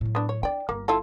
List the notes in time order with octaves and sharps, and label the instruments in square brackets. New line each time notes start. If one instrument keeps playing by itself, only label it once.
[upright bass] A2 F#3
[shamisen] B3 D4
C#5
[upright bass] D4 [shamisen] D5 G5
[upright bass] G1 [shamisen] A#3
[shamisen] E4 F4 A4